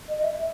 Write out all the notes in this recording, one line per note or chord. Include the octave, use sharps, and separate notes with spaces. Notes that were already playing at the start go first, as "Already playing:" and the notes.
D#5
E5